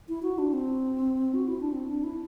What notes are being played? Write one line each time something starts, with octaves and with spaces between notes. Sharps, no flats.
E4
F#4
D4
C4
F#4
E4
D4
C4
D4
E4